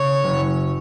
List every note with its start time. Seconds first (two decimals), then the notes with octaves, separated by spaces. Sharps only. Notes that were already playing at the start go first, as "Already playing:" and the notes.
Already playing: C#3 C#5
0.24 F#1 F#2 C#3